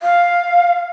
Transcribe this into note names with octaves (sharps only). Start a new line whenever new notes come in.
F5